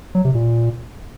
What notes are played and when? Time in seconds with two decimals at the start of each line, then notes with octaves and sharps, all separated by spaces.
0.15 F#3
0.25 C3
0.35 A#2